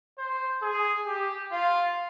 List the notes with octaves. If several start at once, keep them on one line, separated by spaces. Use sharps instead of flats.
C5
G#4
G4
F4